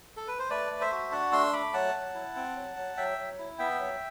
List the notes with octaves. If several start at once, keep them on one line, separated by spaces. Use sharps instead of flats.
A4
B4
C5
A3 B4 D5
A3
C5 E5
F#4
D4 F#5 A5
A3 C6 E6
A3 B5 D6
F#3 F#5 A5
F#3
E4
C4
F#3
F#3
F#3 E5 G5
F#3
E4
B3 E5 G5
F#3